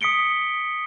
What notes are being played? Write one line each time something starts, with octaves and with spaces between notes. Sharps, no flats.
D#6 B6 C#7 D7 G7